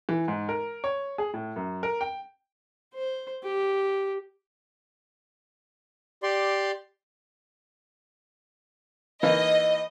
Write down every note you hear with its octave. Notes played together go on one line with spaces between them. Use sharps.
E3
G#2
A#4
C#5
G#4
A2
F#2
A#4
G5
C5
G4
G4 D5 C6
E3 A#3 D#4 D#5